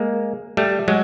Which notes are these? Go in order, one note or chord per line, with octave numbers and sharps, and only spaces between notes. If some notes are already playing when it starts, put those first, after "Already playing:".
Already playing: G#3 A#3
G3 A3
F#3 G#3